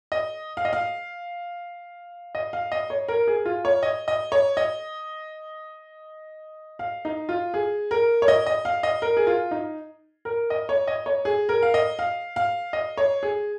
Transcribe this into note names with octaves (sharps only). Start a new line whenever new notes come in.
D#5
F5
D#5
F5
D#5
F5
D#5
C#5
A#4
G#4
F4
C#5
D#5
D#5
C#5
D#5
F5
D#4
F4
G#4
A#4
C#5
D#5
D#5
F5
D#5
A#4
G#4
F4
D#4
A#4
D#5
C#5
D#5
C#5
G#4
A#4
F5
D#5
F5
F5
D#5
C#5
G#4